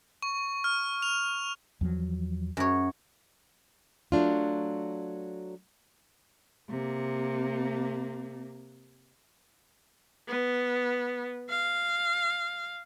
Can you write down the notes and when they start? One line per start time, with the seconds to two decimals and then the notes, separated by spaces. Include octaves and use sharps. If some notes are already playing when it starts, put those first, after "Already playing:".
0.22 C#6
0.64 F6
1.02 F7
1.81 E2 F3 F#3
2.57 F#2 C#5
4.12 F#3 A3 D4 F4
6.69 C3 A#3
10.28 B3
11.50 F5